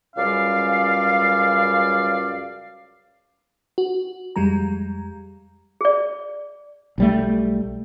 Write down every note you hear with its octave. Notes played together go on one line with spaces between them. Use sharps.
C#2 F#2 G3 C#4 D5 F5
F#4
F2 G3 G#3 A#5
G#4 D5
B1 G3 A3